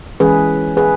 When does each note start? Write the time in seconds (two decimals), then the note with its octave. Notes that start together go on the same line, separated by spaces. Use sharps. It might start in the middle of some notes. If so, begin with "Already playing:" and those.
0.20 E3 G#3 C#4 G#4 B4
0.77 G#4 B4